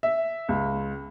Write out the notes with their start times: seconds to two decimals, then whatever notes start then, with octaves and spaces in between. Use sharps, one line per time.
0.03 E5
0.49 C#2